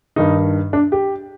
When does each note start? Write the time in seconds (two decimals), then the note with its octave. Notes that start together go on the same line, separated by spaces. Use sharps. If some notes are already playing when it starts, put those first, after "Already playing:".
0.16 G2 D#3 D#4
0.73 D4
0.92 G4